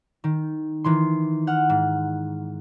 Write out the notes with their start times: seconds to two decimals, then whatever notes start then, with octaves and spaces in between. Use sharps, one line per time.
0.24 D#3
0.84 D#3 E3 C6
1.47 F#5 F6
1.69 G#2